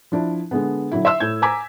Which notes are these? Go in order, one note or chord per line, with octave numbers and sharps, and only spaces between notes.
F3 D4 E4
D3 G#3 B3
D3 F#3 E4
E5 C6 E6
A2 G6 G#6
G#5 A#5 D6 G#6 B6